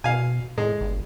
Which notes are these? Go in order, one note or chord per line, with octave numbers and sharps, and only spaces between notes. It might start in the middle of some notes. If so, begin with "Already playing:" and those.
B2 F5 G#5
A2 G#3
G1